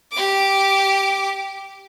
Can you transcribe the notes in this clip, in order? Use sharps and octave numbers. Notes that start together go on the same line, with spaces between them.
G4 D6